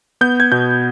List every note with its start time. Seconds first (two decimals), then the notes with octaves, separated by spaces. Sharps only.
0.21 B3 G6
0.40 G#6
0.52 B2 G6